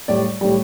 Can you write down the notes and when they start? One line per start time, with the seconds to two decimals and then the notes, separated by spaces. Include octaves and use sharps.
0.08 A2 G3 D5
0.41 A2 G3